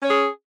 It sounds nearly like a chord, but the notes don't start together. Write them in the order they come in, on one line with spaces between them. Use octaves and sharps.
C#4 C#5 G#4